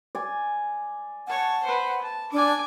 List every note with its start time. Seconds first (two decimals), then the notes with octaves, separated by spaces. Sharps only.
0.15 D5 G#5
1.27 C#5 F#5 A5
1.64 B4 C5
2.02 A5
2.33 D4 G#5 D6